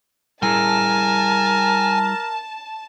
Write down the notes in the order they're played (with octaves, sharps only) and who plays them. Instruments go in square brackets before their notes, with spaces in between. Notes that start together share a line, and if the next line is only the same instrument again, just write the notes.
[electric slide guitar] G3 E4 G#4 [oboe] A#4 [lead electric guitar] G#5 [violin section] A5